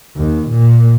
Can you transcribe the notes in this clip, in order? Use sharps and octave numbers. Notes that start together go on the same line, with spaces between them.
D#2
A#2